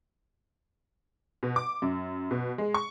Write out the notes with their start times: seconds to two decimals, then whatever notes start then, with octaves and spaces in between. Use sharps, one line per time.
1.43 B2
1.56 D6
1.82 F#2
2.31 B2
2.58 G#3
2.74 C#6